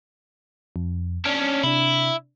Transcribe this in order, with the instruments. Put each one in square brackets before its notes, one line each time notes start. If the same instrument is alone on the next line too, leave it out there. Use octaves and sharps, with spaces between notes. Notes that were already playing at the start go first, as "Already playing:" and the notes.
[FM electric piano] F2
[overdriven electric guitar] C#4 D4 [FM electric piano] F6
[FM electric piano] C3 D4 [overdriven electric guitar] E4